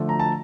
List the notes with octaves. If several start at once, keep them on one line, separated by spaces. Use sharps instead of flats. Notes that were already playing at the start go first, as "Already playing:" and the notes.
Already playing: D3 F3 A3
A#5
A5